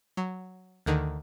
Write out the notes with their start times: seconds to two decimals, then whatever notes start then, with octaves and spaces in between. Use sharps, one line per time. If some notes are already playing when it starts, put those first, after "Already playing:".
0.17 F#3
0.86 D2 D3 D#3